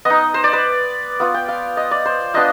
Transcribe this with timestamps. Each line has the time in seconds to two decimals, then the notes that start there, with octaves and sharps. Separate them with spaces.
0.05 B3 D#4 D#5
0.34 C5
0.44 D5
0.53 B4
1.20 B3 F4
1.34 G5
1.48 F5
1.77 D#5
1.91 D5
2.05 C5
2.34 B3 D4 F4 D#5